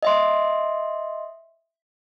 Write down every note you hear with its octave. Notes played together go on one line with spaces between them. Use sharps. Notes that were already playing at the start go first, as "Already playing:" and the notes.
D#5 E5 C6